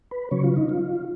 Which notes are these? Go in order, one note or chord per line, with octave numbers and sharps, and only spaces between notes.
B4
C#3 F#3 C#5
F4
D#4
F4